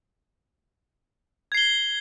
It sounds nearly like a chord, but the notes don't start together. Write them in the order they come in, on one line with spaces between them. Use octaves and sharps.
G#6 C7 G7